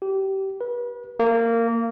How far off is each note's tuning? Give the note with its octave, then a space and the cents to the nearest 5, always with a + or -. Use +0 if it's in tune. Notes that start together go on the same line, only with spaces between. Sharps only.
G4 -25
B4 -35
A#3 -20